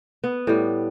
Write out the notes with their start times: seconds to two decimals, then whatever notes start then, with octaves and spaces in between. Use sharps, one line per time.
0.24 B3
0.47 A2 G3